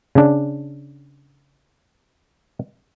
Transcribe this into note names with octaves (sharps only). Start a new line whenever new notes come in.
C#3 D4